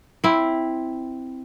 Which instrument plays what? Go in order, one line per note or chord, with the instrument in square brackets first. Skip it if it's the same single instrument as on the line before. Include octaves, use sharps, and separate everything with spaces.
[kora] C4 E4